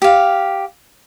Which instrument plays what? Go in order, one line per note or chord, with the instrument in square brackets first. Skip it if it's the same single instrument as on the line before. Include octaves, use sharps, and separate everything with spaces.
[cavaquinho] G4 F5